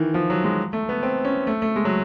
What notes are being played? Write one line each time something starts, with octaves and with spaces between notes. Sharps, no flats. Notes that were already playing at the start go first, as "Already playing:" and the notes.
Already playing: D#3 E3
F3
F#3
G#3
A3
B3
C4
C#4
A3
A3
G#3
F#3